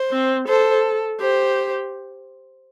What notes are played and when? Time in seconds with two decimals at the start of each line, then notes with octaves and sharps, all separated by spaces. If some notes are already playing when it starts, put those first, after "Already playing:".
Already playing: C5
0.11 C4
0.48 A4 C5
1.21 G4 C5